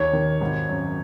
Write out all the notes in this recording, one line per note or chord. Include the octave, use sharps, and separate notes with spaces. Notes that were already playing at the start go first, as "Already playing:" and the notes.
Already playing: D#2 C#5
D#3
G#1
F#2